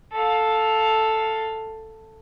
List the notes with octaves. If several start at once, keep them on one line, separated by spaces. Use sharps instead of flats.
A4 F5